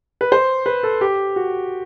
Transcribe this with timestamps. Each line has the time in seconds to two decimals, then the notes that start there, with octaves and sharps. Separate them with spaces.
0.21 B4
0.32 C5
0.66 B4
0.83 A4
1.01 G4
1.36 F#4